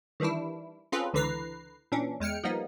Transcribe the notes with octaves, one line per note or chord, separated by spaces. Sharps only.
D#3 E3 G3 D4 E4
C4 C#4 F4 G#4 A4 B4
C#2 D3 E3 B4 A#5 C7
A#2 E3 C#4 D4
E2 G#3 G5 F6 C#7
F3 G3 A#3 B3 D#4